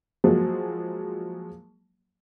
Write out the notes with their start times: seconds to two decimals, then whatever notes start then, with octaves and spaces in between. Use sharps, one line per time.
0.24 F3 F#3 G#3 A#3